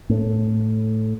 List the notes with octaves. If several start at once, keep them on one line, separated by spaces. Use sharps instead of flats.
A2